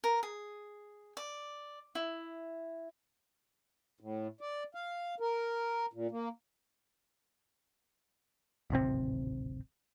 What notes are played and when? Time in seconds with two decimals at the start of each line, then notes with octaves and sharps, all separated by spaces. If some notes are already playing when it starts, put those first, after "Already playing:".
0.04 A#4
0.23 G#4
1.17 D5
1.95 E4
4.00 A2
4.41 D5
4.75 F5
5.20 A#4
5.93 A#2
6.11 A#3
8.70 D1 G#1 C3 C4